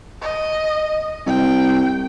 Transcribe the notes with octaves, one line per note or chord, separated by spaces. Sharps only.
D#5
C2 G5